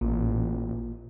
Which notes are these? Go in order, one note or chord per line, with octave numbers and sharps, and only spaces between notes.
A1 A#2